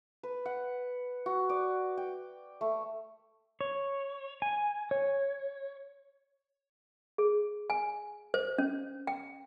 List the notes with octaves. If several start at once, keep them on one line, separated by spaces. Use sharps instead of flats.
B4
F#5
F#4
D5
G5
A3
C#5
G#5
C#5
G#4
G#5
C5
C#4
G5